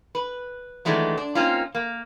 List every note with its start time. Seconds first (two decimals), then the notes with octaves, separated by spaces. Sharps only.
0.15 B4
0.85 D#3 E3 F#3 G#3 A3 D4
1.17 D4
1.35 A#3 C4 C#4 D#4 F4
1.75 A#3